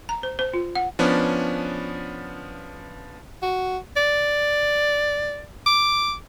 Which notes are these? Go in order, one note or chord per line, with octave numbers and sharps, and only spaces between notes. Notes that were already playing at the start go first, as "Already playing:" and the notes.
A#5
C5
C5
F4
F#5
F3 B3 C#4 D4
F#4
D5
D6